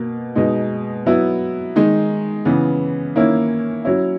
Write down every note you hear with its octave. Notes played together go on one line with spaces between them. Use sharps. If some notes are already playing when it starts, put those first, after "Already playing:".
Already playing: B2 A#3
B2 G#3 D#4
F#3 B3 E4
D#3 G#3 D#4
C#3 E3 B3
D#3 A#3 C#4 E4
F#3 C#4 E4